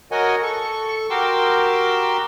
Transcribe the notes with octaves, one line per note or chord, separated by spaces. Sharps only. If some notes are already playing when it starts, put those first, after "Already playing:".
F#4 A#4 C#5 D#5 F#5 G#5
A4 C#6
F#4 G4 A#4 C6 D6 E6